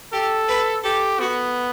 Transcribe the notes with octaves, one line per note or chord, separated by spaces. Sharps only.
G4 A4
B4
G4 A4
B3 F#4